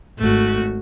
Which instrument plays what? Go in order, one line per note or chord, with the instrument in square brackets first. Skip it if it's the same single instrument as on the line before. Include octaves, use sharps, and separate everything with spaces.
[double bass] G#1 [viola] A3 F#4